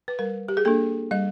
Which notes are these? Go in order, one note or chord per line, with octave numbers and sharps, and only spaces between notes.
B4
G3 A#4
G4
G#4
A#3 D4 A4
G3 D#5